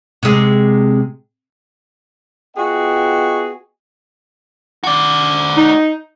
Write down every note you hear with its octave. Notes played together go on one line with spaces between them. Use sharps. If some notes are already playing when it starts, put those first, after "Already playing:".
C3 G#3
B3 F4 F#4 G#4 D#5 G5
F#4 D5
D#4